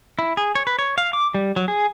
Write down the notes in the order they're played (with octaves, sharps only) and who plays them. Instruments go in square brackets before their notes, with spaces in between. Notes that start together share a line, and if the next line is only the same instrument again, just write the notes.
[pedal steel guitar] E4
G#4
C#5
B4
C#5
F5
D6
G3
F#3
G#4